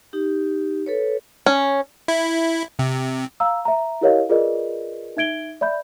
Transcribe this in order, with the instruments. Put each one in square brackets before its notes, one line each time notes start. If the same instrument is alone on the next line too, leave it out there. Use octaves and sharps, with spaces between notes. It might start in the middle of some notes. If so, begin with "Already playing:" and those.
[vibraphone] D#4 G4
A4 B4 C#5
[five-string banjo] C#4
[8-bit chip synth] E4
C3
[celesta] F5 A#5 E6
E5 A#5
E4 G4 A#4 C#5 D#5 F5
F4 G#4 A#4 B4 D5 D#5
D#4 E5 G#6 D7 G7
D5 E5 B5 G6